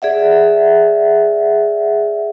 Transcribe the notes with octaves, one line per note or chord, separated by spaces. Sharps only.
G#4 D5 E5 F#5